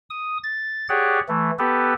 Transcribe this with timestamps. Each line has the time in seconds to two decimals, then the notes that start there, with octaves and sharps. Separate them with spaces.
0.10 D#6
0.43 A6
0.89 G4 G#4 C#5 D5 F#5
1.28 E3 A3
1.59 B3 G4 A4 B4